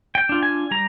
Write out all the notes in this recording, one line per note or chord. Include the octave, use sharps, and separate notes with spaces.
G5
D4 F4
G#5
G3 A#5